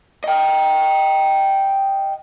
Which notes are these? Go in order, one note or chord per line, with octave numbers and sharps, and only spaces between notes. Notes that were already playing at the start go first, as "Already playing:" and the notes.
D#5 G5